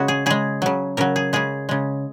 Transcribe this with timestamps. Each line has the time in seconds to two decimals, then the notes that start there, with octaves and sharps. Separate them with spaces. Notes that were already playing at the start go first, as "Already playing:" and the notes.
Already playing: C#3 G#3 F#4
0.08 G#4
0.26 C#3 G#3 G#4
0.62 C#3 F#3
0.97 C#3 F#3 A#4
1.16 G#4
1.33 C#3 G#3 G#4
1.69 C#3 G#3